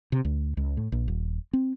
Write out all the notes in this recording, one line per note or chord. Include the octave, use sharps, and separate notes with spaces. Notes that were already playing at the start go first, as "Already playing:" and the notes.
C3
D2
C#2
A2
A#1
D#1
C4